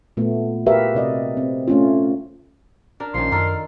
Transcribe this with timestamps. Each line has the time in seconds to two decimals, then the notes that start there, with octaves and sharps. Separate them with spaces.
0.17 A#2 A3 B3
0.66 F#4 G4 A#4 B4 E5 F5
0.95 C3 D5 D#5
1.37 C4
1.68 A3 C#4 F4
3.00 D4 A#4
3.14 A#1 D#3 F3 C#4 C6
3.32 F#2 D#3 D4 A4 A#4